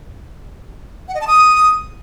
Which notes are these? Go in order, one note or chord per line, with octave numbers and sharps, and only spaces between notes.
F#5
D#5
A5
D#6